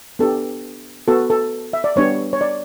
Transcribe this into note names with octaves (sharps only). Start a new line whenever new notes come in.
B3 D4 G4 A4
B3 F#4 A4
A4
E5
D5
G3 B3 D4 G4 C#5
C#5
D5